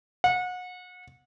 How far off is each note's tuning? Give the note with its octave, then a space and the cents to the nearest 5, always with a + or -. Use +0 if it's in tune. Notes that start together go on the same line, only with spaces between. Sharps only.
F#5 -30